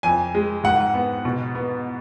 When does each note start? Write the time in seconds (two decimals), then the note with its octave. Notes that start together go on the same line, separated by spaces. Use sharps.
0.03 F2 G#5
0.34 G#3
0.64 G#2 F#5
0.94 B3
1.25 B2
1.55 B3